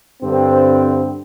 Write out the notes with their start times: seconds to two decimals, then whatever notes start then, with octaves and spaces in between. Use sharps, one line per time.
0.22 G2 D3 C4